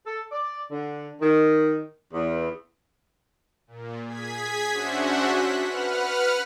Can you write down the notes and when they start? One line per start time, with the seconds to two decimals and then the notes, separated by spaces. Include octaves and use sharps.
0.05 A4
0.30 D5
0.69 D3
1.20 D#3
2.11 E2
3.67 A#2
4.07 G#4 G#6 B6
4.71 C#4 D4 F#4 C5 E5 F#5
5.26 F#6 B6
5.62 B4 F#5 F6